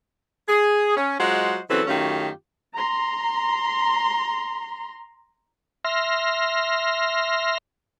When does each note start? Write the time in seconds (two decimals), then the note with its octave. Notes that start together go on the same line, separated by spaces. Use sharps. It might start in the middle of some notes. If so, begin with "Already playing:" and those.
0.47 G#4
0.96 C#4
1.19 F#3 G#3 F4 C5 D#5 F#5
1.69 C#3 E3 F#3 C4 F#4 A4
1.86 F#2 D#3 A3 C#4 F4 G4
2.76 A#5 C6
5.85 E5 C6 F6 A#6